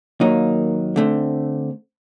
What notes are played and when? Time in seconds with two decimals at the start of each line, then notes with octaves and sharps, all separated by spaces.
0.20 D#2 D#3 F#3 A#3 D#4
0.96 D3 A3 C4